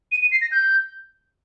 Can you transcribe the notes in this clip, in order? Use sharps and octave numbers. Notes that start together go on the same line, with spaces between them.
D#7
D#7
C7
A#6
G6